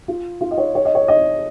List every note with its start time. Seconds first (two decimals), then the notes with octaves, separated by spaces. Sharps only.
0.08 F4
0.41 F4
0.51 D#5
0.58 C#5
0.75 C#5
0.85 D#5
0.95 C#5
1.08 D#5